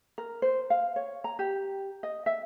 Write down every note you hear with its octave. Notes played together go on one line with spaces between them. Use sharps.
A#4
C5
F5
C#5
A#5
G4
D#5
E5